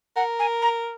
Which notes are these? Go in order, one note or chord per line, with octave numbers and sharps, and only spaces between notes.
A#4 F#5
G#5
A#5